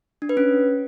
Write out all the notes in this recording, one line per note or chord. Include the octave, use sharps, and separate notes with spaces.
D4
B4
C#4